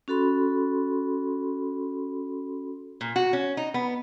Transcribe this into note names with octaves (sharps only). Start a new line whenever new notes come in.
C#4 F#4 A4 B5 C6
A#2
F#4
C#4
D#4
B3